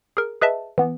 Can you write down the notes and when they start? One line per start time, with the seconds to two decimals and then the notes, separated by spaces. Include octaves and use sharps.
0.17 G#4 A#4
0.41 G#4 B4 D#5 E5 A5
0.78 E3 B3